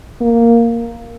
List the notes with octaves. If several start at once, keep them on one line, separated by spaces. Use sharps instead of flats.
A#3